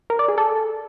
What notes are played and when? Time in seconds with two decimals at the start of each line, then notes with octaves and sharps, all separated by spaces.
0.10 A#4
0.19 D5
0.28 G#4
0.38 A4